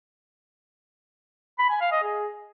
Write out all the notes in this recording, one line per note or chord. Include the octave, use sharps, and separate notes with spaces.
B5
G#5
F5
D#5
G#4